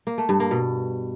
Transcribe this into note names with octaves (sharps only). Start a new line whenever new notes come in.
A#3
A3
G2
A#3
B2